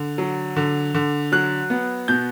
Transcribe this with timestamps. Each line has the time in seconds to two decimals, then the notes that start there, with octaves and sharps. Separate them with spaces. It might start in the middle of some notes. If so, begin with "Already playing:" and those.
Already playing: D3
0.18 F#3
0.56 D3
0.94 D3
1.32 F#3 F#6
1.70 B3
2.08 B2 G6